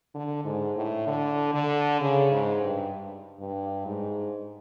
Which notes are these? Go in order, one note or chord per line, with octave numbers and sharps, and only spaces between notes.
D3
G#2
A2
D3
D3
C#3
G#2
G2
G2
G#2